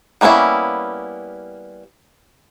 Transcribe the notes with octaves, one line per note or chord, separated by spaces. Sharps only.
G3 A#3 B3 C#4 E4